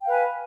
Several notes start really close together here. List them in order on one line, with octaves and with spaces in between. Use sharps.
G5 F5 B4 G#5